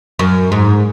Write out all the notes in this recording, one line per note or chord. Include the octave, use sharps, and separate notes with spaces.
F#2
G#2